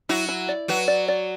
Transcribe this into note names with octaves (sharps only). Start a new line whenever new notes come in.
F#3 E4 F#4
E4
D5
F#3 F#4 B4
D5
D5